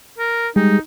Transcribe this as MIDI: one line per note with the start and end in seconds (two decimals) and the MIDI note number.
0.18 0.48 70
0.56 0.79 55
0.56 0.79 56
0.56 0.79 63